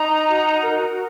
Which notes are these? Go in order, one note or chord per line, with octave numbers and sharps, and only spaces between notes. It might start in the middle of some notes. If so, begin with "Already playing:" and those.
Already playing: D#4 A#5
F#4
A#4